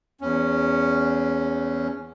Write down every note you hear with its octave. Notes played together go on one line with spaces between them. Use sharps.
E2 C#4